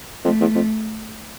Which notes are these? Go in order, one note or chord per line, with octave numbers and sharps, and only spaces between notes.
F2 A3
E2
F2